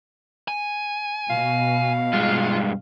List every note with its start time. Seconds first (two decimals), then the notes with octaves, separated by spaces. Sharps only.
0.48 G#5
1.30 B2 F5
2.13 G2 G#3 F4